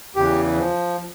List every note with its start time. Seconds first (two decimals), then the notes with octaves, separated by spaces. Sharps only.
0.16 E2 C#3 E3 G4
0.58 F3